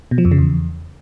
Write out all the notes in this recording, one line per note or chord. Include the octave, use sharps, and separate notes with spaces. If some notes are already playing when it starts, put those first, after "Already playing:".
B2
F3
F2
C#3
E2